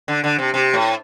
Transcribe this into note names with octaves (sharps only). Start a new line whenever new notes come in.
D3
D3
C3
C3
A2